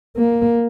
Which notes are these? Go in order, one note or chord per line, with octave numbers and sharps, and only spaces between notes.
A#3